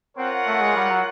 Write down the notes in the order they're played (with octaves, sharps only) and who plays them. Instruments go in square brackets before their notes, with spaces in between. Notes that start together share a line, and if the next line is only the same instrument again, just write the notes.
[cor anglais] C4 [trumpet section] F4 A#4 C#5 F#5
[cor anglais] A3
G#3
G3
F#3